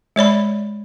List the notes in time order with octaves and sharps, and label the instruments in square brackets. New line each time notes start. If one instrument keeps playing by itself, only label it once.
[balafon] G#3 C#5 D5 B5